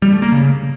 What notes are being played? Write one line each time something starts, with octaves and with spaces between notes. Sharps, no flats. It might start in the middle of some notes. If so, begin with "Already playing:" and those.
G3
A3
A#3
C#3